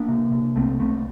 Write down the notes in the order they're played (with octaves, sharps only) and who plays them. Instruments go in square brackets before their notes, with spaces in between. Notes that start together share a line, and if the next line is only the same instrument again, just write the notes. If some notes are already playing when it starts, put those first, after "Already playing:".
Already playing: [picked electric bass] A#3 D4
C3
C3
C2 A3 C4
C2 A3 C4